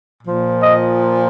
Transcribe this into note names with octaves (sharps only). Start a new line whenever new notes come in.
A#2 F3
D#5